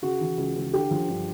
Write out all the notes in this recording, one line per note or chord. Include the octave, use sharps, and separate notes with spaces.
C#3 F#4
E3
C#2
C#2
D3 G4
F3
G2